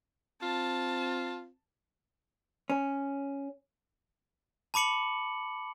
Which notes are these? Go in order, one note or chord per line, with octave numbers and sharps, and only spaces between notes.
C4 F4 A5
C#4
A5 B5 D6 C#7 F#7